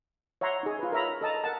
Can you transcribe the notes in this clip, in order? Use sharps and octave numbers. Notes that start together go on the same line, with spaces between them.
C#5 E5 F#5 A#5 C6
D#4 G#4
F4 B4
A#4 C#5 E5 A#5 B5
A4 D#5 A5 A#5
A#4 F#5 A5